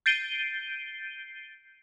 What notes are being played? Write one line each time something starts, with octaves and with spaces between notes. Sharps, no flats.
G6 A6 C7 D7 D#7 G7